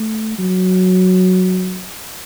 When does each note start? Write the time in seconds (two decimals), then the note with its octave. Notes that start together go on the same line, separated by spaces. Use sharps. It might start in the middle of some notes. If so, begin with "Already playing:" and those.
Already playing: A3
0.38 F#3